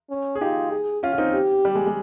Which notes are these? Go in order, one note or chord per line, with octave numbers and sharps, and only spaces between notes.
C#4
G#4
D#4 F4 G4
G#4
C#4 F4
F4
C4 D#4
G4
G3
G#3
G#3